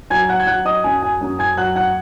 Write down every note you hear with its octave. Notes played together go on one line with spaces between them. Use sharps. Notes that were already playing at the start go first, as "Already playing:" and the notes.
F#3 G#5 G#6
F#5 F#6
G#6
F#3 F#5 F#6
D#5 D#6
F#2 G#5
G#5
F#2
G#5 G#6
F#3 F#5 F#6
F#5 F#6